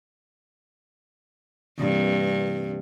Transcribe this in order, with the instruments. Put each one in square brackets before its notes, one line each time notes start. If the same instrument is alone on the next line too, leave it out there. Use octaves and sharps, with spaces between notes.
[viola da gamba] G2 [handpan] C3 E3 A#3